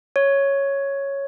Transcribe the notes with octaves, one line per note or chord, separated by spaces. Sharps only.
C#5